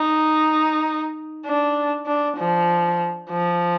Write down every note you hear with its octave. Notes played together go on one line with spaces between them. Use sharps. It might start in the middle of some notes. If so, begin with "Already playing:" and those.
Already playing: D#4
D4
D4
F3
F3